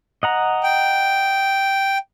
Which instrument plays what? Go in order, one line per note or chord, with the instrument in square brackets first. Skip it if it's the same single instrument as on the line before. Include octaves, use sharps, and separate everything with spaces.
[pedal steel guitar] D#5 F#5 A#5
[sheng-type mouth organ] G5